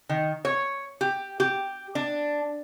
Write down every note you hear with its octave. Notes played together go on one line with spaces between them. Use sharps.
D#3
C#5
G4
G4
D4